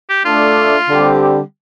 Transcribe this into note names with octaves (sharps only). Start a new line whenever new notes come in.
G4
A3 D4 F4 A4
D3 G3 C4 G4